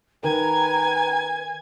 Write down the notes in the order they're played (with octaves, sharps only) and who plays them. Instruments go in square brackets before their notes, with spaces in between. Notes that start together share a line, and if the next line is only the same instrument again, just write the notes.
[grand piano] D#3 A#4 [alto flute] B4 [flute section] G5 A#5 [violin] G#5 G#6